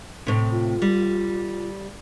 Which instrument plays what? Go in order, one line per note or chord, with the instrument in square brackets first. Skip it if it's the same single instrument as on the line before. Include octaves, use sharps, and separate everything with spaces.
[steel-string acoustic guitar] A2 C3
[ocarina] F4
[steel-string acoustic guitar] G3